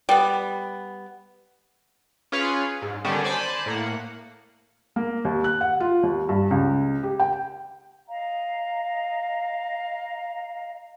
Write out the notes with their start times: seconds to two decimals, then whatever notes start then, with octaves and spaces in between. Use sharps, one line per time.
0.09 G3 B3
2.32 C#4 F4 G#4 B4 C#5 F5
2.82 G#2
3.05 D3 D#3 G3 B3 C#4 D4
3.24 C5 D5 G#5 A5 B5
3.66 A2 A#3 F#5
4.96 A#3
5.25 D#2
5.44 F#6
5.61 F#5
5.80 F4
6.03 D#2
6.29 G2
6.51 C#2
7.03 G4
7.20 G5
8.08 D#5 F5 A#5